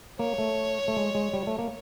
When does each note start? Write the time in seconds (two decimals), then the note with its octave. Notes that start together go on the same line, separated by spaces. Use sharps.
0.19 A#3 C#5
0.38 A3
0.88 A3
0.96 G#3
1.15 G#3
1.33 G3
1.47 A3
1.59 A#3